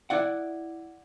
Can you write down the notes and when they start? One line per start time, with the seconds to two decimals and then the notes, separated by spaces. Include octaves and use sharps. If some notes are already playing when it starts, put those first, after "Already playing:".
0.10 E4 D5 F#5